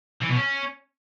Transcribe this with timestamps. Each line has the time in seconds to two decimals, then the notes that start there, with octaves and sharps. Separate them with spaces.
0.22 E3
0.29 B2
0.37 C#4